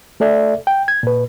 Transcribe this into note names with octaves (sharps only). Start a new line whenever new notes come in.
A3 A4 D5 E5
G5
G#6
A#2 B4